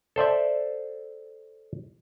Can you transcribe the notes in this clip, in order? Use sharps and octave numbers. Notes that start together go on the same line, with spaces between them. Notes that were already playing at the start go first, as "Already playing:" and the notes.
A4 C5 D5 E5